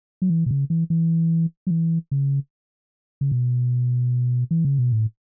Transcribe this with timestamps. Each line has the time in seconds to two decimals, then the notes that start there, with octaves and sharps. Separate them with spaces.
0.22 F#3
0.30 E3
0.46 B2
0.51 C#3
0.70 E3
0.90 E3
1.67 F#3
1.71 E3
2.11 C#3
3.21 C#3
3.32 B2
4.51 E3
4.65 C#3
4.79 B2
4.92 A2